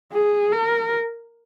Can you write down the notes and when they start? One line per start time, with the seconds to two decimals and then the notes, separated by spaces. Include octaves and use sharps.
0.13 G#4
0.52 A#4